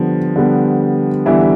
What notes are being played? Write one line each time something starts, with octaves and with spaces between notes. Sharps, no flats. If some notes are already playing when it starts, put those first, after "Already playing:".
Already playing: D3 F3 G3 B3
D3 G3 B3
D3 E3 G3 B3 E4